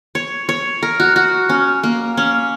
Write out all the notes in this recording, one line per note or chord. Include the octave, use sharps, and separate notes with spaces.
C#5
C#5
A#4
F#4
F#4
C#4
A#3
C#4